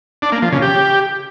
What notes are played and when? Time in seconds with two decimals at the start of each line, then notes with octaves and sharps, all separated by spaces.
0.22 D4
0.32 A#3
0.42 F3
0.52 C#3
0.62 G4